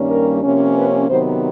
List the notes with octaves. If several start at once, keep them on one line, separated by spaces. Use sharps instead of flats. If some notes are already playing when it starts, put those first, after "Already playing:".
Already playing: G2 D#3 G3 A#3 C#4
A#4
C3 F3 A#3 C#4
B4
C3 D#3 F#3 B3 C5